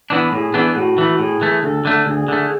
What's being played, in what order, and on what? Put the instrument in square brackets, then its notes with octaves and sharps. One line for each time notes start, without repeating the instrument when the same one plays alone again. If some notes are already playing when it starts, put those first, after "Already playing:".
[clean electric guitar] E3 B3 D4
[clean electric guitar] A2 [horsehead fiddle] G#4
[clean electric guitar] E3 B3 D4
[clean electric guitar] A2 [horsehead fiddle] F#4
[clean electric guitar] E3 A3
[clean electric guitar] A2 [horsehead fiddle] G#4
[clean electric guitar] E3 A3
[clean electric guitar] D2 [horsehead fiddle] A4
[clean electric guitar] D3 A3
[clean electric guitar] D2 [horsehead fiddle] G#4
[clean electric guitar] D3 A3